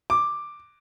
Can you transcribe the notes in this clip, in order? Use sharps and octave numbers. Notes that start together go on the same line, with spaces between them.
D6